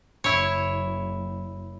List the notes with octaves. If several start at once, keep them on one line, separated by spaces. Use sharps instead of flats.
F#1 E4 C#5